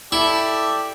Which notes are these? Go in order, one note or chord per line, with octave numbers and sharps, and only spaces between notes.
E4 G4 A4 D5